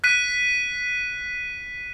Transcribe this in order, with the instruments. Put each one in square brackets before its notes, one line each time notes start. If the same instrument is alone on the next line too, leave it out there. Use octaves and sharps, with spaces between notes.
[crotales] F#6 B6 D#7